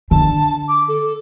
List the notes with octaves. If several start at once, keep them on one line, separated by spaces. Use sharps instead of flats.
D3 A5
D6
A4